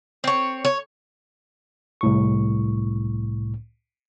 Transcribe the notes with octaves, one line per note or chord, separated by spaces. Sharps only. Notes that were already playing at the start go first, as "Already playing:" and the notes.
C4 C#5
C#5
C2 A2 C#6